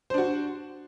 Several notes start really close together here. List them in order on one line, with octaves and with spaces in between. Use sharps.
C5 D4 F#4